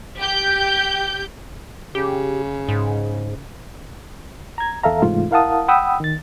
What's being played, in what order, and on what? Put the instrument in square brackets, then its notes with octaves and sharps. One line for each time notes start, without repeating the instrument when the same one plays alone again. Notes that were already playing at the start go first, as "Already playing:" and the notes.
[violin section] G4 G6
[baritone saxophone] C#3 [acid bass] G4
[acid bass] G#2
[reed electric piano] A#5 G#6
E2 A4 E5 F5 A#5
G#2 C3 E3 A3 F4
E4 A#4 F5 F#5 A5 D#6
F#5 G5 B5 D#6 E6
D#3 A6